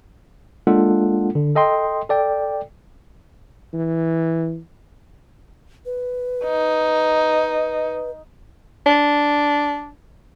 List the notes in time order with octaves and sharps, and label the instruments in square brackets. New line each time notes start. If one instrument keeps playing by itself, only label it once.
[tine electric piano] G#3 A#3 D4 F4 A4 F#5
D3
A4 D#5 G5 C6
A4 D5 G5
[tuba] E3
[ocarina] B4
[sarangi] D#4
[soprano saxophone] D4